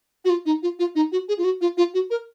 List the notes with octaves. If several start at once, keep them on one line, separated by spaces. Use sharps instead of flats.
F#4
F4
D#4
F4
F4
D#4
F#4
G#4
F4
F#4
F4
F4
F#4
A#4